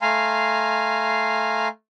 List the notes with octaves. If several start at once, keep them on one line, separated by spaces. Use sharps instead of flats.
A3 F5 G#5 A#5 C6